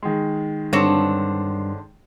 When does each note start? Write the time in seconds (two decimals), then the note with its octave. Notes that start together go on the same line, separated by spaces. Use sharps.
0.03 D#3 G#3
0.73 G2 D3 C4 C#5